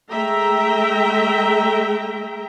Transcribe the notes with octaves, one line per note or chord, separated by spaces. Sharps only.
G#3 A3 E5 G5 A#5